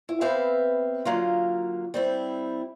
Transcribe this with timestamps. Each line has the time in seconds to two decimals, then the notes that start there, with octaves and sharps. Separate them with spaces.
0.09 E4
0.21 B3 C4 G4 B4 E5 F5
1.05 D3 F#3 A#3 F4
1.94 G3 C4 E4